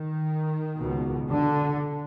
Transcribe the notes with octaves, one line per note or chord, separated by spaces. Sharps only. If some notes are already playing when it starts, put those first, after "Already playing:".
Already playing: D#3
C#2 B2
D3